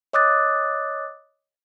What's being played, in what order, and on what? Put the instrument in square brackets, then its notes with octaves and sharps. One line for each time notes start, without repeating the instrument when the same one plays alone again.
[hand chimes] C#5 D#5 D6 D#6 F#6 A6